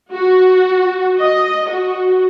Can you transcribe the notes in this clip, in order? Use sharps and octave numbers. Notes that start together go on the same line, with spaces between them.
F#4
D#5
F#4